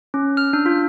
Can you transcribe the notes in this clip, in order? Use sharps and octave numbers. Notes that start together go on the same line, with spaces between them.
C#4
F6
D4
F4